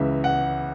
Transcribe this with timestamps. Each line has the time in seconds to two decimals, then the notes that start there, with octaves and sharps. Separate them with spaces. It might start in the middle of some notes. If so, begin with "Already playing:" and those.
Already playing: C#2 C#3 E3 E5
0.24 F#5